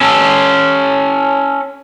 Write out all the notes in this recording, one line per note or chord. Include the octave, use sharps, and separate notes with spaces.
C#4 A4